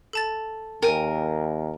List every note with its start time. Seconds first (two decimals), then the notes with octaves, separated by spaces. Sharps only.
0.13 A4 A5 A6
0.82 D#2 A#4 G5 G#5